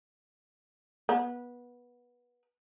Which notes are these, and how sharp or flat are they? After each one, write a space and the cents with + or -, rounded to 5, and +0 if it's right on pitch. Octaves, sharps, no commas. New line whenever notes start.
B3 -20